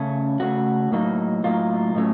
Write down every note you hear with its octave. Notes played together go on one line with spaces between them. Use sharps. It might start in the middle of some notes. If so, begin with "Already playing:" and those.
Already playing: C#3 A3 C#4
C#3 A3 C#4 F#4
A2 F#3 A#3 D#4
A2 F#3 A#3 D#4 F4
A2 F#3 A3 C#4